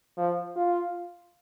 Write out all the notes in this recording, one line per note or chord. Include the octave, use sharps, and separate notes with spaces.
F3
F4